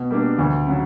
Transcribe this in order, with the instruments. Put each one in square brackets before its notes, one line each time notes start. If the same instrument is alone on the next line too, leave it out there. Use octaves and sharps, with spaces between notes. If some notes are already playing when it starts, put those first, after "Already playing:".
Already playing: [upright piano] B2
G3 A#3 D4
D2
C#3 F#3